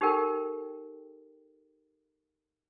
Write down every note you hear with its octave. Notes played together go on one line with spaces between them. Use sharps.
D#4 G4 A4 A#4 G5